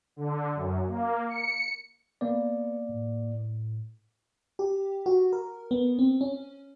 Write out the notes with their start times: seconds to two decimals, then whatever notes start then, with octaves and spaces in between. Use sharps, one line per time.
0.16 D3
0.55 F#2
0.87 A#3
1.29 C#7
2.21 A#3 B3 D5
2.89 A2
4.59 G4
5.06 F#4
5.33 A#4
5.71 B3
5.99 C4
6.21 C#4